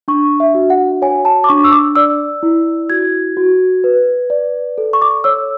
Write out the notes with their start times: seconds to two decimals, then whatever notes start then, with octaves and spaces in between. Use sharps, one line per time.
0.08 D4 C#6
0.40 E5
0.54 F#4
0.70 F#5
1.02 C#5 G#5
1.25 A5
1.44 D6
1.49 D4 C#6
1.64 E6
1.72 D6
1.96 D5 E6
2.43 E4
2.90 F#4 G#6
3.37 F#4
3.84 B4
4.30 D5
4.78 A4
4.93 C#6
5.02 D6
5.24 C#5 E6